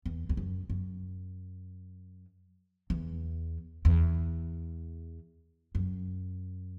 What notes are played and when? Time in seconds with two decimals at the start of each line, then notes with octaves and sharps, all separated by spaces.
0.06 E2
0.29 E2
0.37 F#2
0.70 F#2
2.90 E2
3.85 E2
5.75 F#2